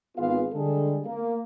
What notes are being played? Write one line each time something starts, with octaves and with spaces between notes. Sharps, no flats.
G#1 B3 F4 G#4 B4 F5
D3 G3 G#3 G#4 A4
A#3